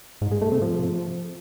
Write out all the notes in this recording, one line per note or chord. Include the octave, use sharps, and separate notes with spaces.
G#2
G#3
A3
C3
F3